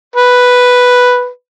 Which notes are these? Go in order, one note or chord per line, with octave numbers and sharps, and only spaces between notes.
B4